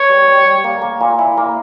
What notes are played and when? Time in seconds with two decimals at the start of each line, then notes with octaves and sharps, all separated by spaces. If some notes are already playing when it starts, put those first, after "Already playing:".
Already playing: B3 C#5
0.10 G3
0.28 G3
0.46 G3
0.64 A#3
0.82 A#3
1.01 A#2
1.19 E4
1.37 A#3